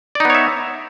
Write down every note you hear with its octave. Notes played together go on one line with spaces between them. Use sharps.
B3 D#4 C#5 D5 E5